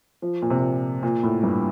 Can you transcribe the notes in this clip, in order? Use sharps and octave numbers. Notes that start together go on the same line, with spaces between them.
F3
A#2
C3
A#2
A#2
A2
G2